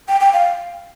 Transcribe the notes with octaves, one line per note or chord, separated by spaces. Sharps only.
G5
G5
F5